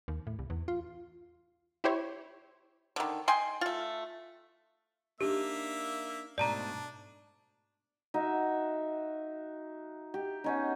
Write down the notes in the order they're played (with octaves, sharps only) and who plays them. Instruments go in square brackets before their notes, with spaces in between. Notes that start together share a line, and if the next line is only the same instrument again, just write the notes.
[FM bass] D#2
A2
C2
E2
F4
[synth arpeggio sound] E4 G4 C5 C#5
[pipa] D3 D#3
D#5 G5 G#5 C6
A3 F4
[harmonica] A#3 E5 [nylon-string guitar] D4 D#4 [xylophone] G4
[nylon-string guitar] G#2 B2 A3 [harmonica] D4 [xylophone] D5 A5 A#5
[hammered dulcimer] D#4 F#4 E5
G4
B3 C#4 D#4